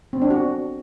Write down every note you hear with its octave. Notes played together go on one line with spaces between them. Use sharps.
C4
D4
F#4